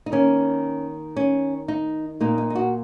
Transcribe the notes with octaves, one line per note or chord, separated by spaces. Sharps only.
D#4
D#3 A#3 C#4
C#4
D#4
A#2 A#3 D#4
D#4
D#4
F#4